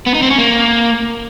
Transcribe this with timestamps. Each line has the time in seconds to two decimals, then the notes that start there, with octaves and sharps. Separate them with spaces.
0.06 B3
0.14 D#4
0.22 C4
0.30 C#4
0.38 A#3